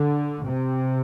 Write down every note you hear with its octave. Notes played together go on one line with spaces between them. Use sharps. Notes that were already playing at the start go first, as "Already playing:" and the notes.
Already playing: D3
C3